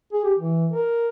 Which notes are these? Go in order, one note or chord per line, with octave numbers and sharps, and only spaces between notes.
G#4
G4
E3
A#4